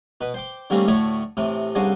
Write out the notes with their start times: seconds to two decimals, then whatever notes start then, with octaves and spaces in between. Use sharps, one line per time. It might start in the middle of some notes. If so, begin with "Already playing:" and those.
0.21 B2 B4
0.34 C5 G5 D6
0.70 D3 G3 A3 A#3 C4 C#4
0.88 D2 A2 A3 C#5 E5 D#6
1.37 A2 C3 E3
1.75 C2 C#3 D4 F#4 C5 G#5